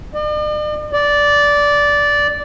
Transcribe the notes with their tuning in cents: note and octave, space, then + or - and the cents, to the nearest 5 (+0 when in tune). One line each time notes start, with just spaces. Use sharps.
D5 +45
D5 -10